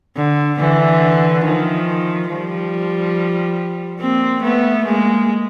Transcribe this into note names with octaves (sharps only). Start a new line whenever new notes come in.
D3
D3 E3
D#3 F3
F3 G3
A#3 C4
A3 B3
G#3 A#3